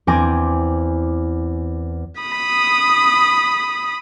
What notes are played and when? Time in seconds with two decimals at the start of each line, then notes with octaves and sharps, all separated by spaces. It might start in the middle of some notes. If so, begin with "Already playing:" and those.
0.07 E2 C4 G#5 D6 A#6
2.21 B5 D#6